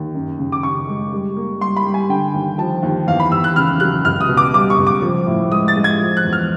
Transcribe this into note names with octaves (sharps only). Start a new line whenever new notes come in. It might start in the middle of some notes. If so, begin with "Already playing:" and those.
Already playing: D#2
F#2
C#3
D6
C#3 C#6
G#3
G3
A#3
G3 C6
B5
G3
G#5
D3 G5
D#2
F3 A5
D#2
E2 F5
B5
E2 E6
F#6
C#3 F6
F#3 F#6
C#2 F6
D#6
B2
D6
G3 D6
C#6
C#2
D6
F3
A2
G#3 D#6
A6
G#3
G#6
F3
F#6
E2
F6